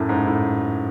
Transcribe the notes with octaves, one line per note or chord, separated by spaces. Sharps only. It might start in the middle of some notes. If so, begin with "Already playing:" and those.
Already playing: F#2 A2
G#2
A2